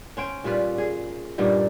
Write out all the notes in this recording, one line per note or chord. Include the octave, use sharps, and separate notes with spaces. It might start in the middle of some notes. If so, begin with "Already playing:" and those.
C#4 C5 G5
A#2 G3 F4 B4
G#4
G2 A#2 G3 D#4